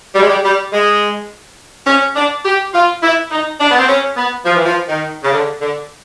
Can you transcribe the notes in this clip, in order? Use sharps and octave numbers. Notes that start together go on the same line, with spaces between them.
G3
G#3
G3
G3
G#3
C#4
D4
G4
F4
E4
D#4
D4
B3
C4
C#4
B3
F3
E3
F3
D#3
C#3
D3
D3